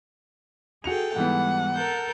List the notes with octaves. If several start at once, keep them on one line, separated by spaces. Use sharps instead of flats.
F#4 G#4 A4 G5 C#7 F7
G#2 E3 G3 B3 F#5
A4 A#4 G6